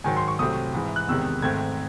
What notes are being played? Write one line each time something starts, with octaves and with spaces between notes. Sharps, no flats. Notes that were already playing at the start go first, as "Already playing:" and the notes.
G#2 D#3 F#3 G#5
C6
C#6
C2 C3 F#3 A3 C4 D#6
G#2 E3 G#3
F#6
E2 C3 D#3 G#3 E6
G#2 D#3 A3 C4 G#6